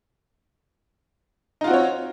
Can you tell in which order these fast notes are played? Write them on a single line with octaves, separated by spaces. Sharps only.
D#4 F4 F#4 C4 C#5